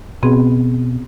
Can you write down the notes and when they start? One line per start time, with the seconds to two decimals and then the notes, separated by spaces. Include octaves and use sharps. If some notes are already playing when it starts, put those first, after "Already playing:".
0.23 B2 B3 C4 G#4